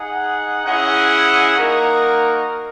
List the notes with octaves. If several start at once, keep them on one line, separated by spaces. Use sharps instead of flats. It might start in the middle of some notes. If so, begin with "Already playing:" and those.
Already playing: D#4 G#4 D#5 F#5
C#4 E4 G#4 D#5 F#5
A#3 D#4 F#4 A#4